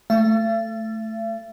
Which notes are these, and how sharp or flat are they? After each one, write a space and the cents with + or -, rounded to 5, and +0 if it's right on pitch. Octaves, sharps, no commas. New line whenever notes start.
A3 -5 E5 +45